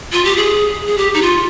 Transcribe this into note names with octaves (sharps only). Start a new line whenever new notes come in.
F4
G4
G#4
G#4
G4
D#4
F4